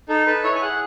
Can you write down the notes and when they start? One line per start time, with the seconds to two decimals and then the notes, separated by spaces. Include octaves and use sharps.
0.09 D#4 A4
0.26 A4 B4
0.44 E4 C#5
0.55 G#5
0.62 G#4 F#5